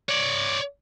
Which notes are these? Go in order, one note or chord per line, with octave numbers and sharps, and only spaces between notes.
C#5 D5